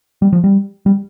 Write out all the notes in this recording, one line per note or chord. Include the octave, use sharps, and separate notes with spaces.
G3
F3
G3
G3